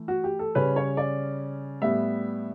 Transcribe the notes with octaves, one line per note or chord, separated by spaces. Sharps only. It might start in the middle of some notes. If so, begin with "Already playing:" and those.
Already playing: E3 A3
F#4
G4
A4
C#3 G3 C#4 B4
C#5
D5
A2 G3 B3 E5